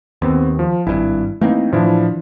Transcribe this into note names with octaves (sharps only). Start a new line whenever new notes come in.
D#2 B3 C4
F3
G#1 G2 E4
E3 A3 A#3 C4 D#4
A2 E3 F3 D4 E4